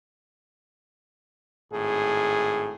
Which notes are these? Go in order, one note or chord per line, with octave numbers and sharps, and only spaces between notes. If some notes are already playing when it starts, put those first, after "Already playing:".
G#1 A2 G#4